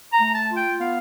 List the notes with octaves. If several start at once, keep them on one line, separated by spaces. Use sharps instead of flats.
A#5
A3
A5
F4
G5
B3 F5